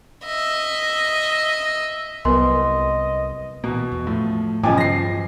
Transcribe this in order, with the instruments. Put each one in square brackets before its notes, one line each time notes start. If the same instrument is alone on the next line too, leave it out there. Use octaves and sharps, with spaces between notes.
[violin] D#5 E5
[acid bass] C2 [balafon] F#3 B3 A#4 [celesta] B4 C6 [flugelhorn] D#5
[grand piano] B2 [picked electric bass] E3 A#3
[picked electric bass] E2
[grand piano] A2 [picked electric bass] F3
[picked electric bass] G2 F#3 B3 [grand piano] C#3 F3 D6 [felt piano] D#5 G#5
[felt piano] F3 [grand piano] A#6 C7